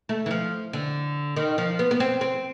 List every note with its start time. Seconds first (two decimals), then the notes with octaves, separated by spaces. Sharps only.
0.09 A3
0.26 E3
0.31 F3
0.73 D3
1.36 D#3
1.58 F3
1.79 B3
1.91 B3
2.00 C4
2.21 C4